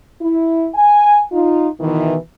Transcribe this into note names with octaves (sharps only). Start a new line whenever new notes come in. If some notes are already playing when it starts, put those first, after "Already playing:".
E4
G#5
D#4 F4
B2 D#3 E3